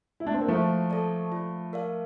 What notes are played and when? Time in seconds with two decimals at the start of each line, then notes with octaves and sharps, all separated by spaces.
0.20 E4
0.27 D4
0.34 C4
0.41 A#3
0.48 F3 A3 E4
0.90 A4 D5 A5
1.32 F4
1.73 A#4 D5 F5